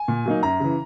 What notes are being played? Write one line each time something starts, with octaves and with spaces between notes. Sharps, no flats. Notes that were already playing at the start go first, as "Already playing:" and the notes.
Already playing: G#5
A#2
F#3 A#3 D#4
F#2 A#5
C#3 E3